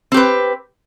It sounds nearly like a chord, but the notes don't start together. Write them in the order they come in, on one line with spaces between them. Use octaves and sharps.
C4 G4 B4